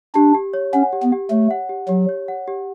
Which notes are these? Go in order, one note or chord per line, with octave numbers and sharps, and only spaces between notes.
D4 G4
G4
C#5
C#4 F#5
G4
B3
G4
A3 C#5
F#5
G4
F#3 G4
C#5
F#5
G4